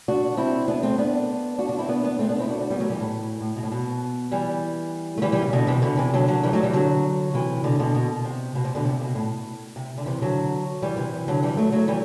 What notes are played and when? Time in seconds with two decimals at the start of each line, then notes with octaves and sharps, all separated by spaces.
0.08 D4 F#4
0.37 C4 E4
0.68 B3 D4
0.83 A3 C4
0.98 B3 D4
1.58 D4 F#4
1.69 D4 F#4
1.79 C4 E4
1.89 B3 D4
2.04 B3 D4
2.19 A3 C4
2.29 B3 D4
2.39 C4 E4
2.49 D4 F#4
2.60 D4 F#4
2.70 G3 B3
2.80 F#3 A3
2.90 E3 G3
3.00 A2
3.41 A2
3.56 B2
3.63 A2
3.72 B2
4.32 E3 G3
5.18 A3
5.22 E3 G3
5.32 E3 G3
5.42 C3
5.53 B2 D3
5.67 C3 E3
5.82 B2 D3
5.97 C3 E3
6.13 D3 F#3
6.28 D3 F#3
6.43 E3 G3
6.53 F#3 A3
6.63 E3 G3
6.73 D3 F#3
7.34 C3 E3
7.64 B2 D3
7.79 B2 D3
7.95 B2
8.25 C3
8.55 B2
8.65 C3
8.75 B2 D3
8.85 C3
9.01 B2
9.15 A2
9.76 C3
9.98 D3
10.06 C3 E3
10.22 D3 F#3
10.82 E3 G3
10.97 C3 E3
11.28 D3 F#3
11.43 E3 G3
11.57 F#3 A3
11.72 F#3 A3
11.88 E3 G3